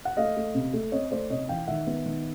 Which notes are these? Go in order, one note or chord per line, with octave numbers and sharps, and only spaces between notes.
F#5
A3 D#5 F5
A3
C3
A3
C4 C#5 D#5
A3 C5 D5
C3 C#5 D#5
E3 F5 G5
D#3 E5 F#5
B3
D#3